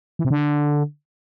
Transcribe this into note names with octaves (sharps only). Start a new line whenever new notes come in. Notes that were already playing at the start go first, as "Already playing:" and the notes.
E3
C3
D3